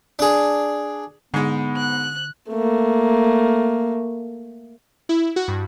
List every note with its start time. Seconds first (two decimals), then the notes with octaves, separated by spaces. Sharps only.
0.19 D4 G#4
1.34 G#2 D3 G#3 B3
1.77 F#6
2.50 A3 A#3
5.09 E4
5.36 F#4
5.48 G2